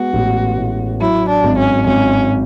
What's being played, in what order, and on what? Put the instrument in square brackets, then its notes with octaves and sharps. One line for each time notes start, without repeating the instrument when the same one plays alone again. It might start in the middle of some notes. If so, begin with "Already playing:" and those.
Already playing: [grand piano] G#3 B3 [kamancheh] F#4
[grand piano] A1
A2
[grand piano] F#3 [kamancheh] E4
[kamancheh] D4
[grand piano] G#1
[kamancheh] C#4
[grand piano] G#1 [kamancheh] C#4